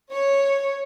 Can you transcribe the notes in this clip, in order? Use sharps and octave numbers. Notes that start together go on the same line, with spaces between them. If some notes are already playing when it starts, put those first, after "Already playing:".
C#5